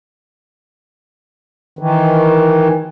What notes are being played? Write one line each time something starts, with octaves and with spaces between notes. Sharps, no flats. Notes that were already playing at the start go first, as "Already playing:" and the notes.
D#3 E3